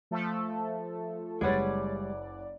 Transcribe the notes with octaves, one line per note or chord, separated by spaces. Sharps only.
F3 A3 A4
F#1 G3 G#3 G#4 B4 C#5 D5 F#5